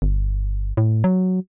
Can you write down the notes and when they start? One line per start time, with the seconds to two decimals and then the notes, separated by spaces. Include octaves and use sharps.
0.02 G1
0.77 A2
1.04 F#3